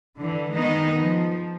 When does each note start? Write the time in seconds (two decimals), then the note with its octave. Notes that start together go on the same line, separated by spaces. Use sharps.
0.17 D3 E3
0.52 D#3 G#3 B3 D#4 D#5
0.98 F3